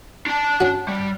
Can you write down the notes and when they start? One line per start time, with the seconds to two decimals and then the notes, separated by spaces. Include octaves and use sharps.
0.27 D4 A5
0.60 C#4 F#4
0.88 G3